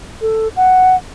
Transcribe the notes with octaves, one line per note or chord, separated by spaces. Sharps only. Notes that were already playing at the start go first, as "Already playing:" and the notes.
A4
F#5